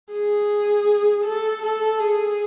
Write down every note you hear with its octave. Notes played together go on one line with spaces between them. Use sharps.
G#4
A4
A4
G#4